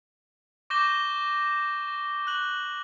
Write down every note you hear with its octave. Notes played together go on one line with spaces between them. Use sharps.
C#6 D6 G6 A#6 E7 G7
A#6
F#6 F#7